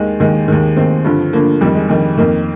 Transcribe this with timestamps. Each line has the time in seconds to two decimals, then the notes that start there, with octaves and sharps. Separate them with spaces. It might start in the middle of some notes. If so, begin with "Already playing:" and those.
Already playing: D#2 D#3 G#3
0.20 D#2 D#3 G#3
0.48 D#2 D#3 G#3
0.77 D#2 D#3 C4
1.05 G2 D3 F3
1.33 G2 D3 F3 A#3
1.61 F2 D#3 G3
1.75 G#3
1.89 F2 D#3
2.18 F2 D#3 A#3